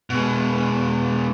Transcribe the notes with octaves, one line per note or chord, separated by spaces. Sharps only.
B2 G#3